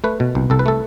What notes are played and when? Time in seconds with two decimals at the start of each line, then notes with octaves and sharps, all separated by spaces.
0.04 A3 B4
0.20 B2
0.35 C2
0.50 C2 A4
0.59 B4
0.66 A3 A4